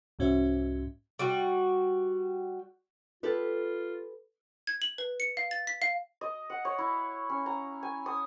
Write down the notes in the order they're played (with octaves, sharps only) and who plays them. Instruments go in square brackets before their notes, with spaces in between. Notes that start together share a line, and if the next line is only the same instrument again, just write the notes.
[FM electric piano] C2 G#2 C#4 F#4 C5 E5
[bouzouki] G3 F#4
[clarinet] F4 [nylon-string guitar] G4 A4 B4
[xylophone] G#6
F#7
B4
C#7
F5
A6
B6
F5
[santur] D#5
F#5
C#5
E4
C#4
A#5
G#5
D#6